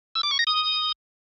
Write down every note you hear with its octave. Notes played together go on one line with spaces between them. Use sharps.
E6
D6
C#6
A#6
D#6